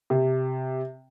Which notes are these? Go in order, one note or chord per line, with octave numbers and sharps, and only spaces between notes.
C3